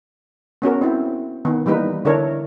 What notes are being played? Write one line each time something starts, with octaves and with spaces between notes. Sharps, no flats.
B3 C#4 F#4 A#4
C4 E4
D#3 B3
E3 G3 A#3 D#4 B4
D3 D4 E4 A#4 C#5